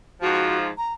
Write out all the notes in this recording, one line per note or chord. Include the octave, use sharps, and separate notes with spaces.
G#2 F3 F#4
A#5